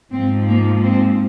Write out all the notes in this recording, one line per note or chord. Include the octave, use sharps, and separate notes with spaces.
G#2 F3 C4
A#3
C4